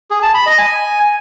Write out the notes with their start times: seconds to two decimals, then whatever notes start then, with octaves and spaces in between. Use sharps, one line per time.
0.11 G#4
0.23 A5
0.35 B5
0.46 D#5
0.58 G#5